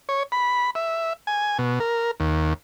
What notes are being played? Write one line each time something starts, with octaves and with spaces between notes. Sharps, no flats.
C#5
B5
E5
G#5
B2
A#4
D#2